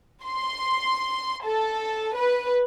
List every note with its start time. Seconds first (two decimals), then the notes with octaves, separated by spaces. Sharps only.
0.25 C6
1.44 A4
2.15 B4